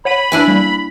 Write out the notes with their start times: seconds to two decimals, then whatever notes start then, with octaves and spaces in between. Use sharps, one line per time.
0.05 C#5 F#5 B5 D#7
0.32 D4 E4 G#5
0.48 G3 A#3